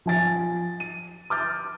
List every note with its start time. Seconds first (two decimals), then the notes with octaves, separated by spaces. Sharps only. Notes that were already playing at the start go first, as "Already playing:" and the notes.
0.06 F3 G#5 A6
0.80 D#7
1.30 D6 F6 G6 A6